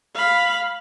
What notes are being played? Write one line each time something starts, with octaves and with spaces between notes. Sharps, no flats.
F5 B5